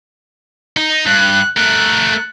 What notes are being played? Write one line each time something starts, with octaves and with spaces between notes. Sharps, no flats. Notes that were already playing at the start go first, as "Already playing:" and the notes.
D#4
G2 F#6
A3 A#4 F#6